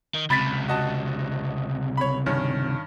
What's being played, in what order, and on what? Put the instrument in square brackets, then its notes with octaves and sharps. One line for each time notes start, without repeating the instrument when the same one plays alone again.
[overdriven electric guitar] D#3
[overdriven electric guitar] C#2 C3 [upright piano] B5 A6 B6
[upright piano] F#4 D#5 A5
C#5 B5
G2 D#3 C#4